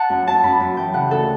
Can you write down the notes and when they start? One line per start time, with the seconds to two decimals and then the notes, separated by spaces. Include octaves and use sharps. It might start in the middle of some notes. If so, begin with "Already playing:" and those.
Already playing: F#5 A5
0.10 F#2
0.27 F#2 A5
0.43 F#2 B5
0.60 F#2
0.76 E3 G5
0.94 C#3 F#5
1.10 D2 A4